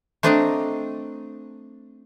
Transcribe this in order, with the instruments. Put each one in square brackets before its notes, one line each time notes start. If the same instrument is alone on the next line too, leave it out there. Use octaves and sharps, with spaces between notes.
[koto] A3 C4 D4 D5 D#5 A#5